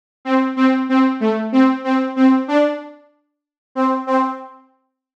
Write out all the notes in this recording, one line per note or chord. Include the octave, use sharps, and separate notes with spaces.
C4
C4
C4
A3
C4
C4
C4
D4
C4
C4